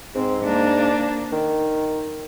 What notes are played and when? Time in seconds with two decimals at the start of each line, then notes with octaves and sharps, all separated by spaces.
0.15 G#2 C4
0.44 A#3 D4
1.32 D#3